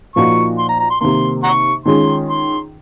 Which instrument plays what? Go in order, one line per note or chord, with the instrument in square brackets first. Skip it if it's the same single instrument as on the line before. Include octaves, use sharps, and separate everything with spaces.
[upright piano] A#2 F3 A#3 D#4 F#4 [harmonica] C#6
[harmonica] C6
A#5
A#5
C6
[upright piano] C3 D#3 A#3 [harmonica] C6
[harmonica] F#5 A#5 C#6
[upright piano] D#3 G#3 C#4 F4 G#4 [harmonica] C6
[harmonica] C6